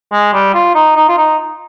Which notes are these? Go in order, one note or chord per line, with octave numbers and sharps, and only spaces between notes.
G#3
G3
F4
D#4
D#4
F4
D#4